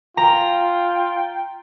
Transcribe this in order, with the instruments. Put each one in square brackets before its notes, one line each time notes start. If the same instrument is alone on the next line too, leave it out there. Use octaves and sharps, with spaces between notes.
[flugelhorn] F4 [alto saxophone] G5 [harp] A#5